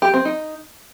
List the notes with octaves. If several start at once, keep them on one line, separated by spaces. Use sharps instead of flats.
G4
C4
D#4